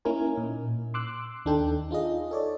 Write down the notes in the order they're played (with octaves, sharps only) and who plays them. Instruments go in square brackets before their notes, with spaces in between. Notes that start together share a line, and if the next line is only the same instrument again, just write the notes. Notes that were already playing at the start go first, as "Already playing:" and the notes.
[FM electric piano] A#3 C#4 D#4 E4 A#4 G#5
A#2
C6 D6 E6 F#6
D#2 D4 D#4 A4 G5
D#4 F4 G#4 D#5
A4 C#5 D5